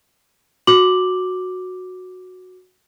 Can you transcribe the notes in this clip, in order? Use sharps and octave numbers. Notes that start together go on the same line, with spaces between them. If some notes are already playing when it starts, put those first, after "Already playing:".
F#4 D6 F#7